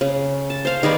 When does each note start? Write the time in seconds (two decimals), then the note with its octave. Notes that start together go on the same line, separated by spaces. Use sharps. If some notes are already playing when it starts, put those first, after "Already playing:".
0.01 C#3
0.50 A5
0.65 C5 F5
0.83 D#3 G#4 B4 D5